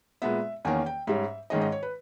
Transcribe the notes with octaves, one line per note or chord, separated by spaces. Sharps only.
A#2 G#3 B3 E5
E2 D#3 A#3 C#4 G#5
G5
G#2 G3 C#4 E5
G#2 D#3 G#3 C#4 D#5
D#5
C#5
B4